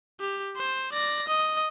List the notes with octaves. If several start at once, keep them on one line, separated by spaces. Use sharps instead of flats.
G4
C5
D5 A#6
D#5